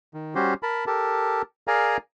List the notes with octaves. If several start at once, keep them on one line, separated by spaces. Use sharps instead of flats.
D#3
G3 C#4 F#4 G4 C5
A#4 A5 B5
G4 A4 A#4 A5
G#4 A#4 D5 F5 G#5 A#5